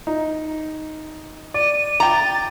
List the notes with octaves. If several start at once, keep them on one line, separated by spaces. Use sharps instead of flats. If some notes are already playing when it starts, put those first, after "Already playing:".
D#4
D5 D#7
G5 A#5 D6 A6